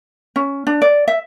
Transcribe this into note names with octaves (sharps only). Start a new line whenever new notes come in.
C#4
D4
D5
E5